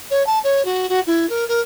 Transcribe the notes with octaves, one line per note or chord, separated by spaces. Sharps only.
C#5
A5
C#5
F#4
F#4
E4
A#4
A#4